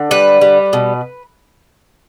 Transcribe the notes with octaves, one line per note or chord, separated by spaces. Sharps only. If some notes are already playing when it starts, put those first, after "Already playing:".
Already playing: D3
G3 B4
G3
B2